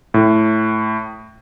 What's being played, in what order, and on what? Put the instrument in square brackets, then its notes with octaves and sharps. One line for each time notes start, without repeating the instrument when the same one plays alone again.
[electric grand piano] A2